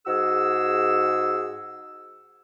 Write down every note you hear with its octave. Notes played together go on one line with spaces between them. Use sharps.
G#2 F#4 G#4 E6